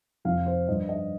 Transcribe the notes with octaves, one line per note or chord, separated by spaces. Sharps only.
F2 C3 F3 F5
C5
G2 F3 D#5
D#5